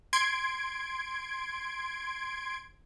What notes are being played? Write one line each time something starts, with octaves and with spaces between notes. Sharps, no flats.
C6 G#6 D7